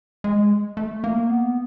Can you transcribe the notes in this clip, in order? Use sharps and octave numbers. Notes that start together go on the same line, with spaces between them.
G#3
A3
A#3
B3